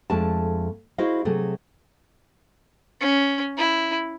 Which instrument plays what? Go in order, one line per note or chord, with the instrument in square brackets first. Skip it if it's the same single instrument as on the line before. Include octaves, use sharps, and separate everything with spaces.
[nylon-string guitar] F2 G#3 A3 D4 A5
E4 F#4 G#4 C5 D#5 F5
C3 F#3 A3 G#4 A4
[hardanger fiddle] C#4
E4